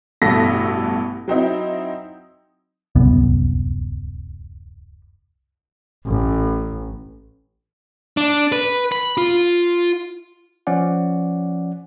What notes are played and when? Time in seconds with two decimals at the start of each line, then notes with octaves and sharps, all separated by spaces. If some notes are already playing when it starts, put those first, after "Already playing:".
0.22 A1 G2 B2 A4 A#6 B6
1.28 F#3 C4 D#4 E4
2.95 D1 C2 F#2 B3
6.06 A1
8.17 D4
8.52 B4
8.92 B5
9.18 F4
10.67 F3 C#4 D5 F#5